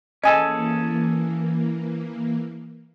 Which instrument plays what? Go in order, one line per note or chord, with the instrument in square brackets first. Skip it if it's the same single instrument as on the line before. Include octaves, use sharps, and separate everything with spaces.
[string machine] E3 A#3 [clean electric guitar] C#4 G#4 A4 [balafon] D#5 G#5